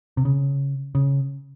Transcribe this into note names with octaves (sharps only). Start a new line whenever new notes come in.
C3
C#3
C#3